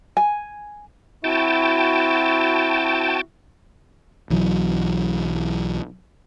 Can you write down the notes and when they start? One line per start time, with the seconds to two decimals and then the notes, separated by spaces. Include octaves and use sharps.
0.17 G#5
1.24 C4 E4 F#4 G5 A5
4.30 B1 E3 F#3